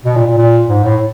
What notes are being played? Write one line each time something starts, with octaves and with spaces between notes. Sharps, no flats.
B2
A#2
A#2
A#2
G#2
A2